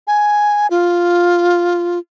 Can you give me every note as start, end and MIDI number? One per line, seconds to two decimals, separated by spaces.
0.07 0.67 80
0.71 1.99 65